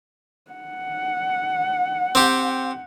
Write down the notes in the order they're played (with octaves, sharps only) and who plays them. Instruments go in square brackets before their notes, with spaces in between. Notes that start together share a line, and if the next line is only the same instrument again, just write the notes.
[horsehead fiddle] F#5
[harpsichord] C4 G4